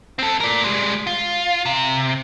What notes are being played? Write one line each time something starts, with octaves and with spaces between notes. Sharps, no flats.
C4 A4
A#4 D5
G3 G#3
F4
C3